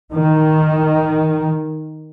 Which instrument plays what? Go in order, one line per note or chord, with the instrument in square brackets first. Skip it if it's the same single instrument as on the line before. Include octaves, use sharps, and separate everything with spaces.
[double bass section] D#3